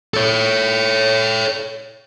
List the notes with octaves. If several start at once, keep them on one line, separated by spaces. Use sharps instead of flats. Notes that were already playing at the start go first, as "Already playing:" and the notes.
A4 C#5